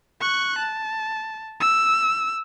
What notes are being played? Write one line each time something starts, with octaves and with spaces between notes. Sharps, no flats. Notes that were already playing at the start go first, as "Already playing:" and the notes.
C#6 F#6
A5
E6